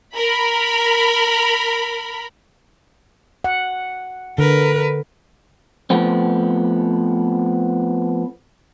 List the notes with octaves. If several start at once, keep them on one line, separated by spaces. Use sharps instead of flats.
A#4 B5
F#5
D3 A#4 B4
F3 A3 B3 C4